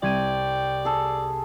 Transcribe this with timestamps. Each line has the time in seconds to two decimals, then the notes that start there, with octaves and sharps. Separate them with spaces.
0.03 C2 D5 G5 G#6 D#7
0.85 G#4 A4